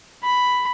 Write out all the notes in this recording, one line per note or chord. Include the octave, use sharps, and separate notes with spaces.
B5